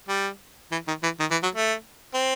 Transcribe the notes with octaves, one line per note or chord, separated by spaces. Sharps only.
G3
E3
D#3
E3
D#3
E3
F#3
A3
C4